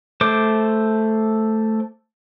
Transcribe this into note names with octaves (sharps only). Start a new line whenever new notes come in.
A3 C5 D6